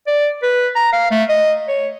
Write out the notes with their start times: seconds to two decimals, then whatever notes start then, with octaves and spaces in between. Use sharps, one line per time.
0.07 D5
0.43 B4
0.76 A#5
0.93 F5
1.11 A3
1.29 D#5
1.68 C#5